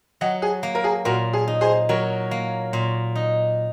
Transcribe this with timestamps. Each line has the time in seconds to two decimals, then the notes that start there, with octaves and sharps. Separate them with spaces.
0.21 F#3 D#5 F#5
0.42 G#4
0.63 A#3
0.75 A#4
0.84 G#4
1.05 A#2 F#4 A#4
1.33 G#4
1.47 D#4
1.61 G#4 C5
1.89 F#3 A#4 C#5
2.31 A#3
2.73 A#2
3.15 D#4